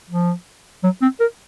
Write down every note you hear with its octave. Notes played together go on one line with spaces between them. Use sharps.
F3
F#3
C4
A#4